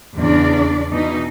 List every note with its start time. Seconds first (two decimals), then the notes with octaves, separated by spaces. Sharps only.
0.15 E2 C#3 D4 D5
0.93 B2 E3 D#4